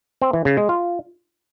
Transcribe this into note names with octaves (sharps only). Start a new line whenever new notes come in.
C4
E3
C#3
G#3
F4